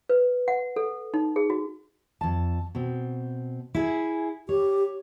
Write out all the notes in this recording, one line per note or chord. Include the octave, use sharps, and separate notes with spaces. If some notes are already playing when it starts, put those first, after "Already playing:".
B4
F#5
A4
D#4
G#4
F#4
F2 A5
B2 C4
E4 G#4 G#5
G4 C#5